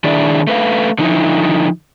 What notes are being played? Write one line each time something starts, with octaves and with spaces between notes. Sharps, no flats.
D#3 D4 E4 G#4 D5
A3 B4 F5
D3 F3 D#4 E4